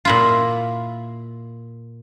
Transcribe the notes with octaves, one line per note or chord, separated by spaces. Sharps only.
A#2 E4 F4